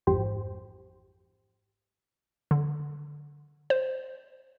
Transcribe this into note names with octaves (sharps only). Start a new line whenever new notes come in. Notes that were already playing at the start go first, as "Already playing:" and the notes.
A1 F2 G#2 G4 C5
D3
C5